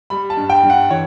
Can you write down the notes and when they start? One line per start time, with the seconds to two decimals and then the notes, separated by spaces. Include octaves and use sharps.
0.10 G3 B5
0.30 A5
0.37 G2
0.50 G5
0.63 G2
0.70 F#5
0.90 E3 C#5